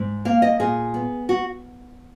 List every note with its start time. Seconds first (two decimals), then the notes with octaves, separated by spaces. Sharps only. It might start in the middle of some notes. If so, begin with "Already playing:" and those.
Already playing: G#2
0.25 A#3 F5
0.42 D#5
0.60 A#2 G#4
0.94 B3
1.29 F#4